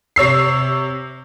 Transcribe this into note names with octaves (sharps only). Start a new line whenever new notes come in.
C3 C#5 E6 C7